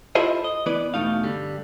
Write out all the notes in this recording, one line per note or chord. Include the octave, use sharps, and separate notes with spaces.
E4 F4 G4 A4 C5 D#5
D#5
E3 B3 B4 D5
E2 B2 A3 D#4 F5
G2 D3 G3